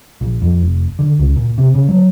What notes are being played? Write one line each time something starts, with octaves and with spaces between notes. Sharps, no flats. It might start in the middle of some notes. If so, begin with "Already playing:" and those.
A#1
F2
F1
D3
C#2
A#2
C3
C#3
F#3